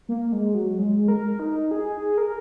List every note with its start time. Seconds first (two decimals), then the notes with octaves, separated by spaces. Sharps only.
0.09 A#3
0.32 G#3
0.54 F#3
0.79 G#3
1.08 A#4
1.39 D#4
1.71 G#4
2.18 A#4